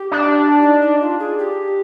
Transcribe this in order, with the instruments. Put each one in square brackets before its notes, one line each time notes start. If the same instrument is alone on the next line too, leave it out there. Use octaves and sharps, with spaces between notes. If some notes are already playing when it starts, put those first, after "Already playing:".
Already playing: [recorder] G4
[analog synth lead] D4
[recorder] D#4
D#4
F4
G#4
G4